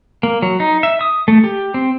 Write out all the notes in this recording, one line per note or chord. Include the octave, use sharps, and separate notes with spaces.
A#3
F#3
D#4
E5
D#6
A3
G4
C4